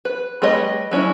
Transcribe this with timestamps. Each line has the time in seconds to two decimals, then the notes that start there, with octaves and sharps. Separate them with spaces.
0.05 B4
0.42 G3 A3 B4 C#5 D#5
0.91 F#3 C#4 D4 E4